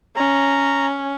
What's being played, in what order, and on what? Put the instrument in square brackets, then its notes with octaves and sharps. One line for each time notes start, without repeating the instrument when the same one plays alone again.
[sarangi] C#4 [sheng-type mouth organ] A#5